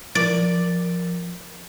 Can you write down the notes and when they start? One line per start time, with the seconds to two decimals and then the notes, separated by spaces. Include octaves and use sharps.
0.15 F3 A#4 D5